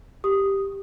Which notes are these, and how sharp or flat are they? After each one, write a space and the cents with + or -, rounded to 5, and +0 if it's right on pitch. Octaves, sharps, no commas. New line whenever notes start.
G4 +0 D#6 +0